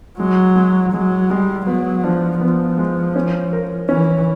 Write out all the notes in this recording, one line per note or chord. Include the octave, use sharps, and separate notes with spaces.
F#3 G#3
G#3
F#3 G#3
G3 G#3
F#3 B3
F3 D4
F3 B3
G#3
C#4
A#4
E3 C#4